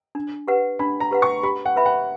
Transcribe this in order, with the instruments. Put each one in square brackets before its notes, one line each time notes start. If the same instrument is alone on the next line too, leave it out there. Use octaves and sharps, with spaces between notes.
[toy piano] D4
G4 B4 F#5
[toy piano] D4 [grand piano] B5
[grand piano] A#5
[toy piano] G4 B4 F#5
[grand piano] C#6
[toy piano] G4 [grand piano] B5
[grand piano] F#5
[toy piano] B4 E5 B5
[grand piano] F#5